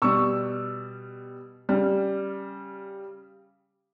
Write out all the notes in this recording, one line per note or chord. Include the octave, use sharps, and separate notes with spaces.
B2 G3 C#6 E6
C#3 G3